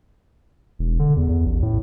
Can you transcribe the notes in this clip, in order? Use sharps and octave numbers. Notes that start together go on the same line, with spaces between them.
E1
D3
E2
E2
A1
A2